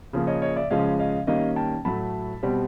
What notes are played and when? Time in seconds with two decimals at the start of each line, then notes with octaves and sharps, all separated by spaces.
0.13 C#3 F3 A#3
0.27 C#5 D#5
0.42 C#5 D#5
0.56 D5 E5
0.70 C#3 F3 G#3 C#4 D#5 F5
0.99 D#5 F5
1.27 D#3 G3 A#3 C#4 D#5 F5
1.56 G5 A5
1.85 A2 F#3 A3 A5 B5
2.43 B2 G3 C4